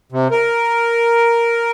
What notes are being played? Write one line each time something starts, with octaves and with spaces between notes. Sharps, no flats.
C3
A#4